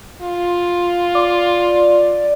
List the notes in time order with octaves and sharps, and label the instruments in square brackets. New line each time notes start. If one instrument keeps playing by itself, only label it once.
[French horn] F4
[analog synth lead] D5